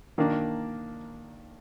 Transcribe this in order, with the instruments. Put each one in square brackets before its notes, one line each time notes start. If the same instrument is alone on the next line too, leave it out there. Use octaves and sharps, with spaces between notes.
[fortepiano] D#3 A#3 D4